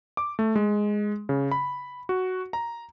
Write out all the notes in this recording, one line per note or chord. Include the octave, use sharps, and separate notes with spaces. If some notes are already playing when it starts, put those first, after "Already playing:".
D6
A3
G#3
C#3
B5
F#4
A#5